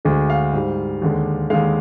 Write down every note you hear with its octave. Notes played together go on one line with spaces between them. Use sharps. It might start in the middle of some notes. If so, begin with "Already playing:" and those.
D2 D3 G#3
F5
G#2 G3
D#2 D3 G#3
D#2 D3 G#3 F5